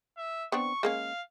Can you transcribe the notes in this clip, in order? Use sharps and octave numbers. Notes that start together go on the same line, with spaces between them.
E5
B3 C4 D4 C#6
G#3 A#3 C#4 F5